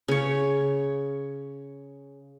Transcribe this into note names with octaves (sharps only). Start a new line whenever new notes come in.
C#3 C#5